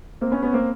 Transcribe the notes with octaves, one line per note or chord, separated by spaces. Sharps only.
A#3 C4
B3 C#4
B3 C#4
A#3 C4